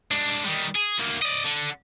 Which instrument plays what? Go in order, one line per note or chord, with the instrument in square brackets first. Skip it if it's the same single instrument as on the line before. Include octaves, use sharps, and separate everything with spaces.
[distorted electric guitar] G#3 D4
D#3 G3
G#4
D2 A#3
D5 D#5
D3